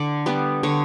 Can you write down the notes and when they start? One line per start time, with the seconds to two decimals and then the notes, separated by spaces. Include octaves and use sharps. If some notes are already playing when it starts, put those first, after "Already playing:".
Already playing: D3 D5
0.26 G3 B3
0.63 D3 C#5